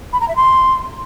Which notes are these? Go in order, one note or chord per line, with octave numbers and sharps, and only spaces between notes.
B5
A#5
E5
C6